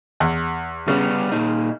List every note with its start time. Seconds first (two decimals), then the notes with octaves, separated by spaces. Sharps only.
0.20 E2
0.88 C#3 G3 B3
1.32 A#2 D#4